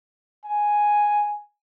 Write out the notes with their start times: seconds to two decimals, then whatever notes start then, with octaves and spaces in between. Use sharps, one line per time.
0.46 G#5